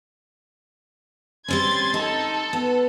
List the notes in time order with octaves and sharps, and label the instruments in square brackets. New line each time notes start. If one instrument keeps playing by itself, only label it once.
[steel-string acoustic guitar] G3 C4 C#4 [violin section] C6 G#6 A6
[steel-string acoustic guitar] D#4 [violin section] A4
[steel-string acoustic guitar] B3